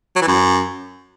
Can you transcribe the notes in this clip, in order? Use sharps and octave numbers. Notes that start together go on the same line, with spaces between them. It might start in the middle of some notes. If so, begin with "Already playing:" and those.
F#3
E3
F#2